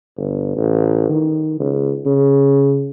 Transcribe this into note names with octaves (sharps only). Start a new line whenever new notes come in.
G1
A1
D#3
C#2
C#3